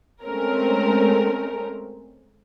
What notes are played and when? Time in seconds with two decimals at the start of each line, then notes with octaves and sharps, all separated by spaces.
0.23 G#3 A3 C4 C#4 A#4